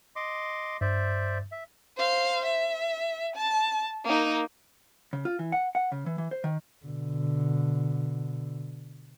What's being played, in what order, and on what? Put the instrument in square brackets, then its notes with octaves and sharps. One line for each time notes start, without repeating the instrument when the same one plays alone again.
[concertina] D#5 C6 D6
[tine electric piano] G2 [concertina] C5 D5 E5
[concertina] E5
[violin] C5 F5
E5
A5
A#3 D#4
[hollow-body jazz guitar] C#3
F4
E3
F#5
F#5
C#3
E3
E3
C5
D#3
[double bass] B2 D3